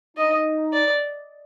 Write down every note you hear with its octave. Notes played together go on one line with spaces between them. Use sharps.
D#4 D#5
D5